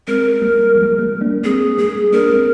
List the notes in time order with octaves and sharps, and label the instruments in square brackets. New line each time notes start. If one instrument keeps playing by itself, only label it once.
[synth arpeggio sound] G#3 C4 [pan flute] A#4
[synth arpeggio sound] G3 A#3
F3 G#3
G3 A#3
A#3 D4
[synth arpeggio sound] G#3 C4 [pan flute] G#4
[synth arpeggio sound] G3 A#3 [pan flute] G#4
[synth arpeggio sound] A#3 D4 [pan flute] A#4
[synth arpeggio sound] G#3 C4